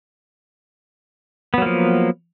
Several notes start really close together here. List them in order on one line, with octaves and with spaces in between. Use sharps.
B3 F#3 A#3 F3